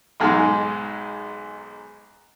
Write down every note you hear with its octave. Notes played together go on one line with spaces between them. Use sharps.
B1 G#2 G#3 D#4